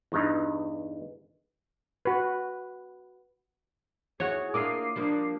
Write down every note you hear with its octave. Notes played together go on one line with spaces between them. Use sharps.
E2 G2 D#4
F#4 B4
E2 F#4 G#4 C#5
A#3 D4 F4 D6 D#6 C7
F3 G3 A#3 D4